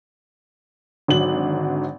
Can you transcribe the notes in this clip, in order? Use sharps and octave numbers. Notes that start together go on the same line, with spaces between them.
G#1 D3 F#3 F#7